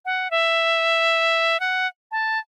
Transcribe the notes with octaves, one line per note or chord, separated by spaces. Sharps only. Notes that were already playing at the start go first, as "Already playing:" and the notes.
F#5
E5
F#5
A5